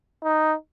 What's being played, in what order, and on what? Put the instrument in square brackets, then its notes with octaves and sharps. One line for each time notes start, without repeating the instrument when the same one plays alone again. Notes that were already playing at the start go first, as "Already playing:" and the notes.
[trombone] D#4